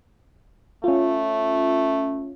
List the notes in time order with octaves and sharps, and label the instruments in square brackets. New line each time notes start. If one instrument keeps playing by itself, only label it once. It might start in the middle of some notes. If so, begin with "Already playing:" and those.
[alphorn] A3 [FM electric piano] C#4 F4